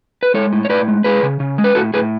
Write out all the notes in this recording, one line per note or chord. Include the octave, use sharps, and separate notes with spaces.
B4
G#3 A4 C#5
A2
C#5
A2 B4 D5
G#3
G#3 G#4 B4
C#3
C#3
G#3
B4
A2 F#4 A4
A2 G#4 B4